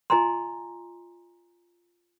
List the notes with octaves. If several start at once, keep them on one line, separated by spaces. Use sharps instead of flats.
F4 D#5 G#5 A#5 C6